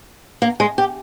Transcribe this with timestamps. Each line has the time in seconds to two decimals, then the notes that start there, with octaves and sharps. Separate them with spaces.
0.42 A#3
0.60 G#3
0.78 G4